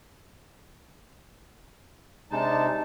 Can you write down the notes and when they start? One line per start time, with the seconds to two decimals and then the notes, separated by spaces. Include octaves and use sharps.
2.31 C3 G#3 D4 D#4 A5